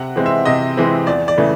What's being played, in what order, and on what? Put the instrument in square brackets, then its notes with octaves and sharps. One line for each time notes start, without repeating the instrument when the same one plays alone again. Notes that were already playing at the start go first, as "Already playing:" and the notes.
Already playing: [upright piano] C3 F#5
E3 G#3 C4
E5
C3 D#5
E3 G#3 C4
E2 D5
D5
C#3 E3 A3